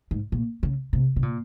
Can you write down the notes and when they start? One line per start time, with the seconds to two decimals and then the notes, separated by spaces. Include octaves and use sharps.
0.11 G#2
0.32 A#2
0.63 C#3
0.93 C3
1.16 C3
1.23 A#2